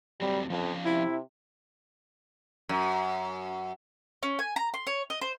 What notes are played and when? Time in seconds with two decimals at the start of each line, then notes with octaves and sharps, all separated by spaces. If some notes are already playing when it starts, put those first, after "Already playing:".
0.21 F#3 G3 A3 C4
0.50 F2 F3 C#4 F5
0.85 C3 E4
2.69 F#2
4.23 C#4
4.39 G#5
4.56 A#5
4.74 C6
4.87 C#5
5.10 D#5
5.21 C5